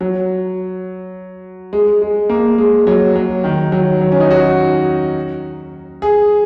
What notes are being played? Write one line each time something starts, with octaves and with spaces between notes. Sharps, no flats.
F#3
G#3
G#3
A#3
G#3
F#3
F#3
D#3
F#3
F#3
C#4
D#4
F#4
G#4